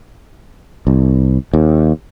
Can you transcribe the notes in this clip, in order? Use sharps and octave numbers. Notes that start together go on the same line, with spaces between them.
C2
D#2